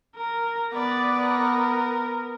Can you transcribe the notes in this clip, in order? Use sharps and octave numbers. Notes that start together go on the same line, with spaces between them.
A#4
B3 B4 D5
A#4